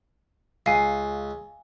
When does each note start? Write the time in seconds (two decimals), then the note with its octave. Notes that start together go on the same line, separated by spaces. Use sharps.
0.66 C#2 F5 G#5